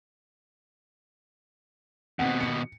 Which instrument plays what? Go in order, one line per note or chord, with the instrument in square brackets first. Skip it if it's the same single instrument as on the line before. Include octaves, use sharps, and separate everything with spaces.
[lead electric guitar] D#2 B2 [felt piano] C4 F#5
[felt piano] C#7